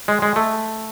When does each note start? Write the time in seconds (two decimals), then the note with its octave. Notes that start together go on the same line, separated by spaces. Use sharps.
0.08 G#3
0.22 G#3
0.36 A3